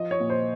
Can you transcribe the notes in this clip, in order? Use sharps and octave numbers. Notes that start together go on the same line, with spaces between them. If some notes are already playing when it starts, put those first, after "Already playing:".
Already playing: F3 D#5
C#5
A#2
C5